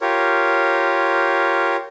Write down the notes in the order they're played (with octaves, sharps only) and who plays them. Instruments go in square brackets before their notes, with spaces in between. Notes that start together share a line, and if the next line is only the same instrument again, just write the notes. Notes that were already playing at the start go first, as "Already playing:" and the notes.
[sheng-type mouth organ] F4 G4 A#4 C#5